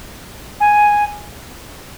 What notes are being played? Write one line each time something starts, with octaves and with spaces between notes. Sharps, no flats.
G#5